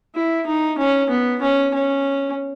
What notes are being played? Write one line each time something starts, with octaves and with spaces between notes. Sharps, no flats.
E4
D#4
C#4
B3
C#4
C#4